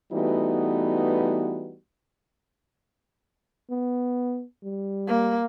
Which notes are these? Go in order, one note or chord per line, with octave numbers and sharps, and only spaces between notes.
E3 G3 A3 B3 D#4 F#4
B3
G3
A#3